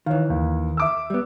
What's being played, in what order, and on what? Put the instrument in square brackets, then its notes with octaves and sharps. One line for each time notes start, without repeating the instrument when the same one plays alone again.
[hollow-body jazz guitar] D#3 E3 [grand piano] C#5 F5
[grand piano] D#2
E5 D6 E6
[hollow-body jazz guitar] G3 B3